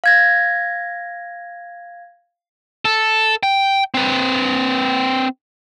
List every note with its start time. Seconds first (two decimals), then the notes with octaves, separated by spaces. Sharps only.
0.04 F5 G#6 A#6
2.85 A4
3.43 G5
3.94 C4 B4